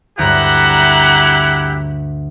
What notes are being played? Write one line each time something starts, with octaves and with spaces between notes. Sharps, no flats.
D2 G2 E4 G4 F#5 A#5 F#6